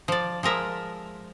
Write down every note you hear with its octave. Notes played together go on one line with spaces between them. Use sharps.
F3 D5
F3 G#3 A#4 E5